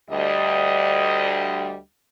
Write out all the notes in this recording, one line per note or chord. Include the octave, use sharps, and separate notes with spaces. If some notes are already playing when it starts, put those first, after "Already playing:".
D2 G3 D#5